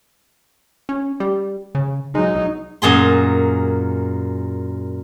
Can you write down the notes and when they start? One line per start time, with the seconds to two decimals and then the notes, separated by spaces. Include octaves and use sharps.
0.89 C#4
1.20 G3
1.75 C#3
2.15 F#3 G#3 D#4
2.82 F#2 A#2 G#4 C6